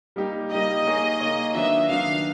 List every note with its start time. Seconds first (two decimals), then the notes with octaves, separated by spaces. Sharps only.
0.16 G3 A#3 D#4 G4
0.51 G3 A#3 D#4 G4 D#5
0.85 A#3 D#4 G#4 C#5
1.20 A#3 D#4 G#4 C#5
1.54 D#3 F#3 B3 D4 E5
1.89 D#3 F#3 B3 D4 F5